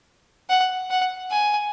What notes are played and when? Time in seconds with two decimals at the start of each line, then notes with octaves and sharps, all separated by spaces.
0.50 F#5
0.90 F#5
1.30 G#5